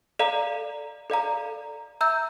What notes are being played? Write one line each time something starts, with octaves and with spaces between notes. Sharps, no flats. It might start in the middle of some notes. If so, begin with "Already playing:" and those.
A4 D5 F5 A#5
A4 D5 F5 A#5
E5 A#5 E6 G6